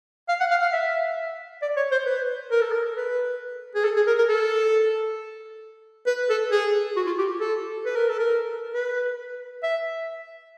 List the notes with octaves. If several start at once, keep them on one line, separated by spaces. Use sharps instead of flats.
F5
F#5
F5
F5
E5
D5
C#5
C5
B4
A#4
A4
A#4
B4
G#4
A4
G#4
A#4
A#4
A4
B4
A4
G#4
F#4
F4
G4
A4
B4
A#4
A4
A#4
B4
E5